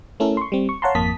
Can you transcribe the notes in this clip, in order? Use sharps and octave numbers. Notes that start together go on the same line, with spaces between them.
A3 C#4 E4 A4 A#4
C6 C#6
G3 C4
C#6
C#5 F5 F#5 A5 A#5 C6
G#1 F2 A#3 A5 D#6 B6